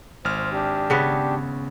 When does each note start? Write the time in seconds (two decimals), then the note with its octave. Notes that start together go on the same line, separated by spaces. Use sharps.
0.25 G#1 C5 F6
0.52 D4 G4
0.90 C#3 B3 C#5